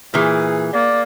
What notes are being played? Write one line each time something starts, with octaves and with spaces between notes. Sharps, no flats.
A#2 E3 G#4
A#3 D5